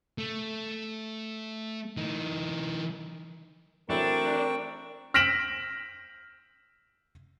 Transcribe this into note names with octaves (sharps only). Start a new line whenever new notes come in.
A3
E3 D#4
E3 F#3 A3 C4 D4 A#4 G5 C#6
F6 A#6 B6 D7 E7 F#7